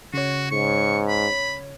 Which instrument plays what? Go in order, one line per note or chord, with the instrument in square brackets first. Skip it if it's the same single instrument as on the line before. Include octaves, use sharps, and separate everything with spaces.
[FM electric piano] C#3 C#5 [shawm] F#4
[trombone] G#2 [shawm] C#6
[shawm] B5